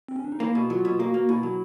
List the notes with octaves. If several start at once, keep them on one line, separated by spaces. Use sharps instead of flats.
C4
C#4
D4
D#4
A#3 E4
B2
F#3 F4
B2
A#3 F#4
A#3
B2 E4
F#3